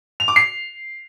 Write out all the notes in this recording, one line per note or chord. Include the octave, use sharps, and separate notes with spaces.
F7
D6
C7